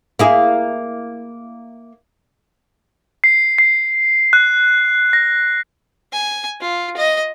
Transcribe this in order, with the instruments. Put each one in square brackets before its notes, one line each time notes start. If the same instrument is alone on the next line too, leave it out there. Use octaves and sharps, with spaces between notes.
[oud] A#3 E4 G#4
[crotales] C7
C7
F#6
A#6
[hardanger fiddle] G#5
F4
D#5